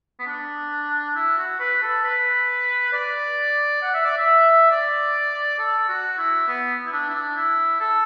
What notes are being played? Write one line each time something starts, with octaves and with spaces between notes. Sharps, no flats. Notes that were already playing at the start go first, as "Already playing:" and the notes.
B3
D4
E4
F#4
B4
A4
B4
D5
F#5
E5
D5
E5
D5
A4
F#4
E4
B3
E4
D4
E4
D4
E4
A4